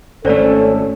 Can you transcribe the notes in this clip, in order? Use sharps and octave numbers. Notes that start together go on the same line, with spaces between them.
G#1 A3 C#4 A4 C5 D5 A#5